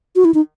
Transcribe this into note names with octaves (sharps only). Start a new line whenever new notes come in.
F#4
E4
D#4